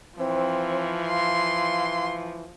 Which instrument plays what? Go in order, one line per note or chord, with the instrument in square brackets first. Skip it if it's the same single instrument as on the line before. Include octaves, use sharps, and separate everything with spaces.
[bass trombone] E3 [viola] F3 [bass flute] C4
[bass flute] F5 [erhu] C6